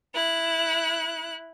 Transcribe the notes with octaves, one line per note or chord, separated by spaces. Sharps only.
E4 F#6